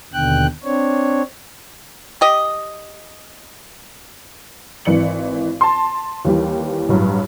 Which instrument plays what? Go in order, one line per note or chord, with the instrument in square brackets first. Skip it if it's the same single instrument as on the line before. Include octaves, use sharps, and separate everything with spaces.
[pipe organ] D#2 B2 D3 G5 F#6
C4 D4 C#5
[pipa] G4 D#5
[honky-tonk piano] G#1 E3 D5 C#7 F#7
A5 C6
D#2 E3 G3
A1 G2 F#3